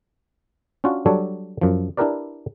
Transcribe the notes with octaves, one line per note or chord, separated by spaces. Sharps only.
C#4 D4 F4 F#4
F#3 G3 D4 A4 C#5
F#2 F3
D4 E4 G4 A#4 B4 D5